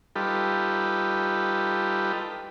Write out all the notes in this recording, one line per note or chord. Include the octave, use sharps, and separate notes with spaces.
G3 D#4 F4 G4 A4 B4